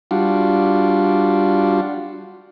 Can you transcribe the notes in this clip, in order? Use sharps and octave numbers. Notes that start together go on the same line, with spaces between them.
G3 D4 F4 F#4